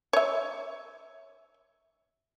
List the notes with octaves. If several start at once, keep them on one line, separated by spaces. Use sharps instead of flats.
C#5 E5